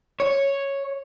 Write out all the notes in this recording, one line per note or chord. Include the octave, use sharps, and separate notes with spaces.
C#5